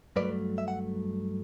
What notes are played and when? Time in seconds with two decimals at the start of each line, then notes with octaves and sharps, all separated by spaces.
0.16 G2 F#3 A3 B4 D5
0.58 E5
0.68 F#5